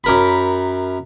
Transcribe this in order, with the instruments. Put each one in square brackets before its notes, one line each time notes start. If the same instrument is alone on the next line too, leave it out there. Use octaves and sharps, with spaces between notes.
[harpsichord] F#2 A#4 B5